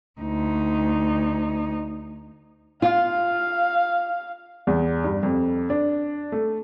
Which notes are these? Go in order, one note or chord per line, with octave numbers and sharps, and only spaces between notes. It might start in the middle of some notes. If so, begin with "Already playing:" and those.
D2 D#4
F4 F5
E2
G2
F2
D4
A3